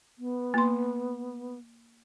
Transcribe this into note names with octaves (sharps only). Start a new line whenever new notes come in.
B3
A#3 C6